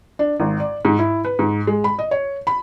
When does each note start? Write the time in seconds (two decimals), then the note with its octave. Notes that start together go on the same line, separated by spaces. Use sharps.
0.19 D4
0.40 G#1
0.60 D5
0.85 G#2
0.99 E4
1.25 B4
1.39 G#2
1.67 G#3
1.84 B5
1.99 D#5
2.11 C#5
2.47 B5